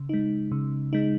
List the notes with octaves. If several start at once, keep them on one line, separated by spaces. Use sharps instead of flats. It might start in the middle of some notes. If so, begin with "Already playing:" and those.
Already playing: C#3
G#3 D#4
C#3
G#3 D#4